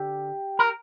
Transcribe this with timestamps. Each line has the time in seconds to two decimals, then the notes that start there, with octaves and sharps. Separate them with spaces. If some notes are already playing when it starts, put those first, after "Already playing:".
Already playing: D3 G4
0.59 A#4